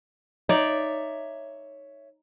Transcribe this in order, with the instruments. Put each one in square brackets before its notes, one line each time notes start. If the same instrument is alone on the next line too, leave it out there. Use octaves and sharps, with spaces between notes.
[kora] D#4 D5 [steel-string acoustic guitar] C#5 E5